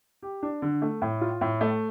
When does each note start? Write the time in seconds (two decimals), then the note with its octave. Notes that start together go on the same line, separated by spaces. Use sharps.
0.22 G4
0.43 D4
0.62 D3
0.82 A3
1.02 A2
1.21 F4
1.41 A2
1.61 A3